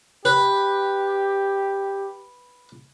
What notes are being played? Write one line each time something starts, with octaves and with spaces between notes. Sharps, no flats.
G4 B4